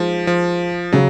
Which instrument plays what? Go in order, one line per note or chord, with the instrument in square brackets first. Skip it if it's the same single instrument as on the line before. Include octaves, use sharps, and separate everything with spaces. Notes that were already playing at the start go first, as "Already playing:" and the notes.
Already playing: [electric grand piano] F3 [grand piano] G#3 D#4
[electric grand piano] F3
[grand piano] C#3 [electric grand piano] F#3